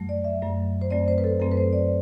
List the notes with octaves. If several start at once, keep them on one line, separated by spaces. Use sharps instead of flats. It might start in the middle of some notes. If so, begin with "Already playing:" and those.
Already playing: F#2 F#3 A3
D5
E5
F#2 F#3 A3
C5
F#2 F#3 A3 C4 D5
C5
B4
A4
F#2 F#3 A3 C4 A4
B4
C5
D5